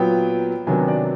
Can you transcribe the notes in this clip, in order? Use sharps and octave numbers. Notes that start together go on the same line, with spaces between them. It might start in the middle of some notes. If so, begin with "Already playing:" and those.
Already playing: A#2 F#3 B3 G5
C3 D#3 F#3 B3 D4 G#5
D5